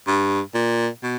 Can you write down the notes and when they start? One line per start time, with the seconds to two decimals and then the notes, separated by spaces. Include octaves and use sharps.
0.07 G2
0.54 A#2
1.03 B2